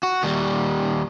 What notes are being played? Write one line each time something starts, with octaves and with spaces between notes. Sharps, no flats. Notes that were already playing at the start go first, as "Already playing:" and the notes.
F#4
D#2 G3